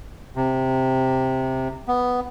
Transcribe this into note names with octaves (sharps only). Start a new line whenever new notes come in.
C3
B3